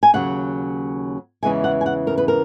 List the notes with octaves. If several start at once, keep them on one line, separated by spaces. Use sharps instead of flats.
G#5
D#2 C#3 F#3 F#5
E2 C#3 E3 G#3 G#5
F#5
G#5
F#5
A#4
B4
A#4